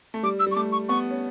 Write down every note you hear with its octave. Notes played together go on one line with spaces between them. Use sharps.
A3
G3 D6
E6
G3
C#6
A3 D6
C#6
B3 C#6
C#4